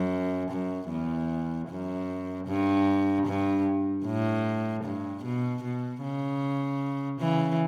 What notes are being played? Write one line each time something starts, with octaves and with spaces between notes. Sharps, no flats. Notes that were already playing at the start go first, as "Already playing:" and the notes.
Already playing: F#2
F#2
E2
F#2
G2
G2
A2
G2
B2
B2
C#3
C#3 E3